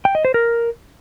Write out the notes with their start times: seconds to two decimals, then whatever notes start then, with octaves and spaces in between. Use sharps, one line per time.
0.05 G5
0.15 D#5
0.25 C5
0.34 A#4